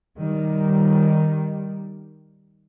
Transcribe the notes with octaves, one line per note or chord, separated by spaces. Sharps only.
D#3 G3